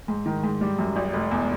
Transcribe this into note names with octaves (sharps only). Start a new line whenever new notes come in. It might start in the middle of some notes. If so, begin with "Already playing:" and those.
G#2
D#3
G#2
G3
F#2
G#1
F1
E2